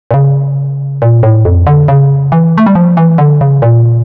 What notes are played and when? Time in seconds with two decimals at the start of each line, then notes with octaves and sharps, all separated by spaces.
0.11 A#2
0.14 C#3
1.02 A#2
1.23 A2
1.45 F2
1.67 D3
1.88 C#3
2.32 E3
2.58 A3
2.66 G3
2.75 F3
2.97 E3
3.18 D3
3.41 C#3
3.62 A#2